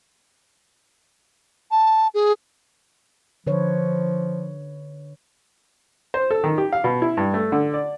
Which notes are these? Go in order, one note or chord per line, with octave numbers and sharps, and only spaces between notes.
A5
G#4
D3 F3 B4 C#5
C5
A4
D#3
G4
F5
B2
E4
G2
A3
D3
D5